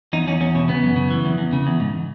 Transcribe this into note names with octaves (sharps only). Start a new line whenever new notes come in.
E2 D#4
E2 C#4
E2 C#4
B2 C#4
C#3 B3
F#2
C#3
E3
E2
E2
C#3
E2
G#2